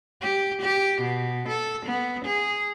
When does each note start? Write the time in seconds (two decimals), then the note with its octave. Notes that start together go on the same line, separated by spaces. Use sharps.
0.22 G4
0.61 G4
1.01 B2
1.48 A4
1.86 B3
2.25 G#4